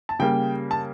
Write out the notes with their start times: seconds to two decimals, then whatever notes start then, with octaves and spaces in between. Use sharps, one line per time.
0.09 A5
0.19 C#3 G3 A#3 G5
0.71 A5